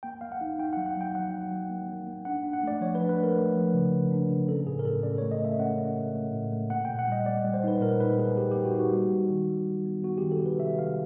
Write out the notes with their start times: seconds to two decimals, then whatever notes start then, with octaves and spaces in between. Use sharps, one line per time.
0.03 A#3 G5
0.21 A#3 F5
0.32 F#5
0.41 D#4
0.58 D#4 G5
0.73 F#3 F#5
0.86 F#5
0.97 F#3 G5
1.15 F#3 F#5
1.33 F#3
1.51 F#3
1.70 A#3
1.89 A#3
2.07 A#3
2.25 D4 F#5
2.44 D4
2.53 F#5
2.63 A3 D5
2.81 F3 C#5
2.95 B4
3.00 D4
3.09 B4
3.19 A3 A#4
3.37 A3
3.56 F3
3.74 C#3
3.93 C#3
4.11 D4
4.30 C#3
4.49 C#4 A4
4.66 A2 G#4
4.79 A#4
4.85 A2 A4
5.03 C#4 D5
5.18 A3 C#5
5.31 D#5
5.41 A3 E5
5.59 C#4 F#5
5.78 C#4
5.96 A3
6.14 A3
6.33 A2
6.52 A3
6.70 A#3 F#5
6.85 A#2 G5
6.99 F#5
7.08 G3 D#5
7.25 A#3 D5
7.45 G3
7.54 C5
7.64 D#4 B4
7.81 A#2 A#4
8.00 D#4 B4
8.19 A#3 G#4
8.37 A#3 G4
8.51 A#3 G4
8.65 F#4
8.74 D#4
8.79 F#4
8.93 G3
9.11 G3
9.30 D#3
9.49 G3
9.67 G3
9.86 B3
10.04 B3 F#4
10.18 D#3 G4
10.32 A4
10.42 C3 B4
10.60 C3 E5
10.78 D#3 F5